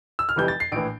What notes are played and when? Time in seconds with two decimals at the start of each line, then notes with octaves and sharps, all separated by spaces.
0.19 E6
0.29 F6
0.36 F1 F2 E3 G3 G6
0.48 A6
0.60 C7
0.72 A#1 A2 E3 D7